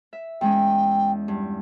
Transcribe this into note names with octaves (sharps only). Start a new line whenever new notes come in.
E5
E2 G#3 C#4 G5
G2